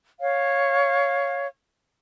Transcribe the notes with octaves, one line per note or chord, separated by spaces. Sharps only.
C#5 F5